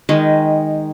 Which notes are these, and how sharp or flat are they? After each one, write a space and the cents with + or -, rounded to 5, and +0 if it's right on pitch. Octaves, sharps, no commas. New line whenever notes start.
D#3 +0 G#3 -15